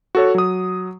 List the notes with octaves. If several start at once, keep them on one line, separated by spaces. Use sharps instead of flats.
F#4 A4 C#5
F#3 D#6